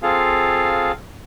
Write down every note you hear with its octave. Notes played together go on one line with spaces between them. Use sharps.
C4 F4 G#4 A4 F5